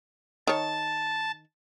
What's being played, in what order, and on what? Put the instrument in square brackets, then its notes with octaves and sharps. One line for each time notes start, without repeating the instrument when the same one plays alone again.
[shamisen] D#3 C#5 [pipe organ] A5